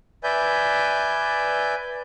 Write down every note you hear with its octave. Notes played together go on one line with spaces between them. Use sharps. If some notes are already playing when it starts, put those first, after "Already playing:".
B4 D5 E5 G#5 G6